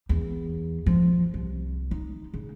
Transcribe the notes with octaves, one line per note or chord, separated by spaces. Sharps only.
E2
F3
C2
D#4
C#3